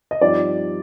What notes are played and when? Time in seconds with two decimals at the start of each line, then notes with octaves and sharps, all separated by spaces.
0.11 D#5
0.21 G2 F3 C4 D#4 D5